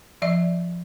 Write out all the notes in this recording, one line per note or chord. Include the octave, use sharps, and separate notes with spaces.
F3 D5 E5